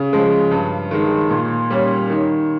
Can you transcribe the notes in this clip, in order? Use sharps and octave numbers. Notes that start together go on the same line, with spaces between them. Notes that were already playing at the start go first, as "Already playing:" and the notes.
Already playing: C#3
F3 G#3
G2
D#3 G#3
A#2
G3 C#4
D#3